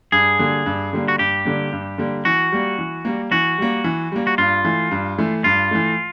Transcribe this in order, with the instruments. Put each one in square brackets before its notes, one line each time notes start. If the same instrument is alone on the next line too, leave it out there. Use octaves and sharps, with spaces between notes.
[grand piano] G2 [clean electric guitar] G#4
[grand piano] D3 G3 A#3
G2
D3 G3 A#3
[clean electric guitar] F#4
[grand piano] G2 [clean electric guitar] G4
[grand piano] D3 G3 A#3
G2
D3 G3 A#3
[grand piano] E3 [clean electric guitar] F#4
[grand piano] G3 A#3
E3
G3 A#3
[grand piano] E3 [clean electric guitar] F#4
[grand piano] G3 A#3
E3
G3 A#3
[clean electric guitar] F#4
[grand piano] G2 [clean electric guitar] F4
[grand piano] E3 A3
G2
E3 A3
[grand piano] G2 [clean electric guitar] F4
[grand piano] E3 A3